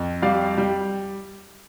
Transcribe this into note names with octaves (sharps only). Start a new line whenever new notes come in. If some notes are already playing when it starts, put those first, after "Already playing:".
Already playing: F2
G3 D5 F5
G3